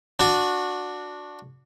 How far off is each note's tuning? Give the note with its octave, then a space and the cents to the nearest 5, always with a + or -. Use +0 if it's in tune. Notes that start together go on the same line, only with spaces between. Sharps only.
D4 +0 F#4 -20